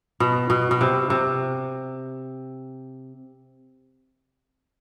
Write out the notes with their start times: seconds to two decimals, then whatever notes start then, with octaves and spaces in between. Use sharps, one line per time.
0.20 B2
0.50 B2
0.71 B2
0.81 C3
1.10 C3